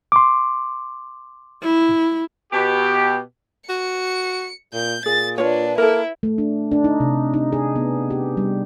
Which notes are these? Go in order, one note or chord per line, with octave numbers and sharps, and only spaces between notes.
C6 D6
E4
B2 G4
F#4 C#7
A#2 G6
A#2 G#4 A6
D4 F4 B4 C#5
A#3 E4 A4 A#4
A3
D4
D4
D#4
C3
D#4
G#4
B3
G4
G3